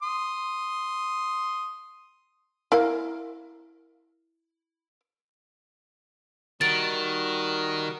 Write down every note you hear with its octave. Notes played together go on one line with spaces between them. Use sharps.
C6 D#6
E4 A#4 F5
D#3 G3 F#4 A#4 A6 D7